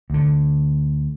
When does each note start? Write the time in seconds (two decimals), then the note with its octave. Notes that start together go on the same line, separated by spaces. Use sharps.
0.10 D2 D3